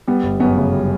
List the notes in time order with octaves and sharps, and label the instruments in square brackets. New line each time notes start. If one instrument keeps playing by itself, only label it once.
[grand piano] G3 [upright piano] B3
[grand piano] G1
[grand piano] F#2 [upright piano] B3
[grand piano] C#3
G3